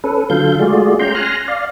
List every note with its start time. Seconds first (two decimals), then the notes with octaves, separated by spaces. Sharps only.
0.04 C#4 A4 B4
0.30 D3 F#3 F4 A4 F5 G6
0.59 G#3 A3 F4 F#4 G#4 D5
0.99 C#4 G5 A#5 C6 G6
1.15 G#5 C6 F6 F#6 A#6
1.48 D5 F5